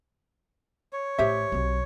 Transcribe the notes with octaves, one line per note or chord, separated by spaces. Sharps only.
C#5
A1 G4 C5 E5
B1 C4